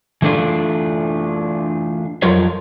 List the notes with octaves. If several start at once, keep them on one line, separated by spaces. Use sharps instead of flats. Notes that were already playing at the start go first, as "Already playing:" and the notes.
E3 A3 D4 F4
F2 F#3 F4 A#4 C#5